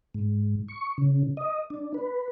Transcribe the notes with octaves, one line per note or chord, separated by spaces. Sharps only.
G#2
C#6
C#3
D#5
D4
B4